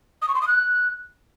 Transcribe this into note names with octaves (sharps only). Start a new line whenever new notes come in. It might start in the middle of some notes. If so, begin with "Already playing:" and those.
D#6
C#6
C6
D#6
F#6